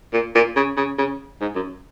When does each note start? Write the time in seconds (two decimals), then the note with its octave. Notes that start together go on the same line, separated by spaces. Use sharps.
0.13 A#2
0.35 A#2
0.56 C#3
0.77 C#3
0.98 C#3
1.41 G#2
1.56 F#2